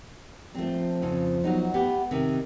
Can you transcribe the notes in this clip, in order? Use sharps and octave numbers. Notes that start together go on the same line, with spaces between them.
F3 A3 C4
F2 C#3
F#3 B3 D#4
A3 B3 G4
C3 D#3